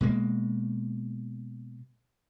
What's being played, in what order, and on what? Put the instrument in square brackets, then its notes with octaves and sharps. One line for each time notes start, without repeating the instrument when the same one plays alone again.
[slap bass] B2 G#3 A#3